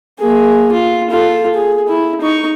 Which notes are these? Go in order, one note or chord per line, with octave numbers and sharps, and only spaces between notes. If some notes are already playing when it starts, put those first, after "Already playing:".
A#3 G#4
F4
F4 A4
G#4
E4
D#4 C#6